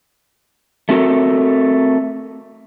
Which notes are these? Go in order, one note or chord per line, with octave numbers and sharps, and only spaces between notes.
A3 C4 F#4 A4 A#4